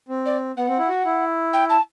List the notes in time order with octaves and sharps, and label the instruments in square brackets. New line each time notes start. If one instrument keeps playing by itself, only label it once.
[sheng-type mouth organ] C4
[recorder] D5
[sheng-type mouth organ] B3 [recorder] F#5
[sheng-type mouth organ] C4
E4
F#4
E4
[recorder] G5
A5